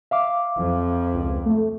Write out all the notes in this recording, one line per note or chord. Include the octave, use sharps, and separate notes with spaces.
E5 F5 D6
F2
C#2
A3